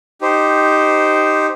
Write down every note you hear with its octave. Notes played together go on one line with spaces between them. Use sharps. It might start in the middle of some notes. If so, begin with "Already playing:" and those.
D#4 G4 C5